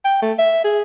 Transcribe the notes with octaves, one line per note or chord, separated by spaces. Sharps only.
G5
A3
E5
G#4